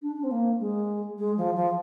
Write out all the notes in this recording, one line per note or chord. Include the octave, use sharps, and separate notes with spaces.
D4
D4
C4
A#3
G#3
G#3
F3
F3